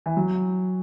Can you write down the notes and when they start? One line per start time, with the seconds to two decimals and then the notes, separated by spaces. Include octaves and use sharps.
0.06 E3
0.17 F#3